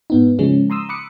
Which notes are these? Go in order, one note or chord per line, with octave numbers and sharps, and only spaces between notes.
G#2 B3 D#4
C#3 F3 G#3 C#4
A#5 C6 D#6 E6
B5 D6 D#6 F#6 C#7